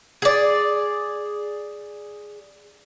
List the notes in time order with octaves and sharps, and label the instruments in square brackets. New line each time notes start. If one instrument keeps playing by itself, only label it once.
[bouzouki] G#4 D5